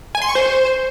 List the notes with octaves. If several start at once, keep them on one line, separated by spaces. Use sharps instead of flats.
G#5
C6
C#6
C5